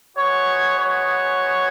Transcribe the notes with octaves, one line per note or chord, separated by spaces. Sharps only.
G#3 B3 F#4 C#5
C#5